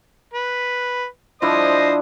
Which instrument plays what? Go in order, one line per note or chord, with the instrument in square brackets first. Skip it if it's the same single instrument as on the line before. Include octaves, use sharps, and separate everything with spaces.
[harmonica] B4
[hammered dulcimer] F3 D4 E4 [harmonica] C5 D#5 D#6